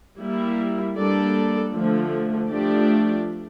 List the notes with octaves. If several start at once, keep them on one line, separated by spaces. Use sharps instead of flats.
G3 A#3 E4
G3 A#3 D4 A4 D5
D3 F3 A3
F3 A3 D4 G4 D5